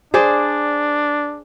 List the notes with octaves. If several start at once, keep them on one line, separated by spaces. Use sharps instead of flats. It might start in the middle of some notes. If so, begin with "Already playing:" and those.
D4 G#4 C5 D5